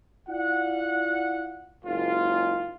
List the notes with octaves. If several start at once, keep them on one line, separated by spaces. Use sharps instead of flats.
E4 F4 D5 F5 F#5
F#1 G#2 F4